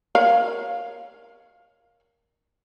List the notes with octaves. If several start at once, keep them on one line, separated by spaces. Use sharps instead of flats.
A#4 C#5 F5